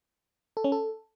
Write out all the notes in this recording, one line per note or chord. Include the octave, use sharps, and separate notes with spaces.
A4
C#4
A4